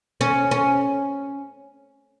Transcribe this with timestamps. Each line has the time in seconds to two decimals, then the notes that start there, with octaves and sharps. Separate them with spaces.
0.21 C#4
0.51 C#4